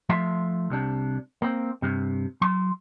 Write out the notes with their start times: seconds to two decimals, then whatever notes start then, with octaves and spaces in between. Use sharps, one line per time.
0.09 F3 A3 F4 E5 C6
0.70 C2 C3 D4
1.42 A#3 C4
1.82 G2 C3
2.41 F#3 C6